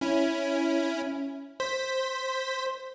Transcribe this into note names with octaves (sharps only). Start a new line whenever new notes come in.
C#4 E4
C5 B6